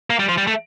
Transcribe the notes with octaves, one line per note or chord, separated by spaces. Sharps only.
A#3
G3
F3
G3
A3